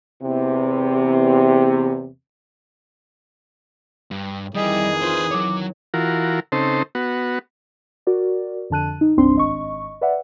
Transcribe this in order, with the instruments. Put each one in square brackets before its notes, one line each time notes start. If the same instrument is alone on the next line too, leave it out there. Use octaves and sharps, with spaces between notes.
[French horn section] E2 C3
[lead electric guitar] G2
[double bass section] F2 D#3 E3 [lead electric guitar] G3 [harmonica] G#4 [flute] D#5
[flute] F4 [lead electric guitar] B4 C5
[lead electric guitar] F#3 C#5 [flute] D6
[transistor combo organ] E3 F4 F#4 A#4
C#3 C4 D#4 A4 C5
B3 F#4
[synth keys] F#4 A#4 D5
F2 D3 A5 F#6 D#7
D#4
G1 C2 G2 C4 D4 C6
G#1 D#5 C#6
B4 D5 E5 F#5